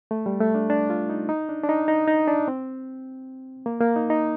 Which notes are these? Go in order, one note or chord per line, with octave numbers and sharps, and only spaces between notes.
A3
G3
A3
D4
D4
F4
D#4
D#4
D4
D4
D#4
D#4
D#4
D4
C4
A#3
A#3
D#4
D#4